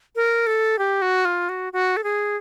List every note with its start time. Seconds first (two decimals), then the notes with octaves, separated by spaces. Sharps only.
0.16 A#4
0.47 A4
0.79 G4
1.02 F#4
1.25 F4
1.49 F#4
1.73 F#4
1.97 A4
2.04 G#4